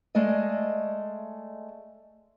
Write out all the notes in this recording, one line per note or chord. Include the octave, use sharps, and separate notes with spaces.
G#3 A3 D5 D#5